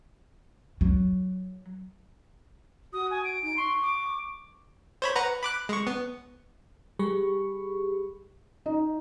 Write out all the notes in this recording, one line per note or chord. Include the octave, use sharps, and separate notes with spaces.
F#3
F#4 D#6
G#5
D7
D#4 D7
C6 C#6
D6
C5 C#5 B5
B4 F#5 A#5
B5 D6 F#6
G#3 C#6
B3
G3 G4 G#4 B5 C#6
D#4